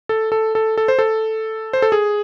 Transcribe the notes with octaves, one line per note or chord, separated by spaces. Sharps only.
A4
A4
A4
A4
C5
A4
C5
A4
G#4